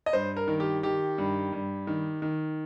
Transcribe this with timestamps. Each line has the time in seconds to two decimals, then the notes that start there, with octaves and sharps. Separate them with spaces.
0.06 D#5
0.13 G2 C5
0.36 A#4
0.48 D#3
0.60 G4
0.83 D#3 G4
1.18 G2
1.52 G2
1.87 D#3
2.22 D#3